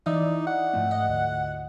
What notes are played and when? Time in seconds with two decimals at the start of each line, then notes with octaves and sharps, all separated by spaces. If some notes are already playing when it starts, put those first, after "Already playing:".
0.06 E3 D#4 D5 E5
0.47 F#5
0.73 G#2 F3 A3
0.91 D#5
1.09 D2